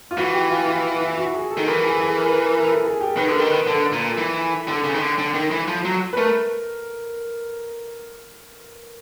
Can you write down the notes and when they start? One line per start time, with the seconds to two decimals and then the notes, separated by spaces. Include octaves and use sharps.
0.11 F4
0.17 E3 F#4
0.34 G4
0.50 F4
0.67 E4
1.01 E4
1.17 F#4
1.34 G#4
1.51 A4
1.57 D#3
1.67 E3 A#4
1.84 G#4
1.96 G#4
2.01 A4
2.18 A#4
2.25 B4
2.32 A#4
2.42 A#4
2.59 A#4
2.67 A4
2.84 G#4
3.01 G4
3.17 D#3 B4
3.29 D3 A4
3.34 A#4
3.40 D#3
3.51 B4
3.67 D3 A4
3.92 A#2
4.17 E3
4.68 D3 A4
4.84 C#3
4.94 D#3
5.01 D3
5.18 D3
5.34 D#3
5.51 E3
5.68 F3
5.85 F#3
6.13 B4
6.17 A3 A#4